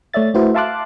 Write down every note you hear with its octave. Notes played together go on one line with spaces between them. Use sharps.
A3 C#5 D5 E5 A6
A3 E4 F#4 B4 C5 E5
E5 F5 A5 C6 D6 F#6